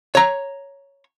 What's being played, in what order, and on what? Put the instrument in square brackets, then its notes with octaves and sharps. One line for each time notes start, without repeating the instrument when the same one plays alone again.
[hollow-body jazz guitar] C#5 A#5